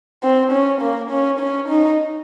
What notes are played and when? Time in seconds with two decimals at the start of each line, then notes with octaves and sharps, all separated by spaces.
0.23 C4
0.52 C#4
0.81 A#3
1.10 C#4
1.40 C#4
1.69 D#4